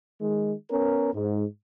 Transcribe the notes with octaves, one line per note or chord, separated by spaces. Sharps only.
D#3 G#3
B3 C#4 A#4
G#2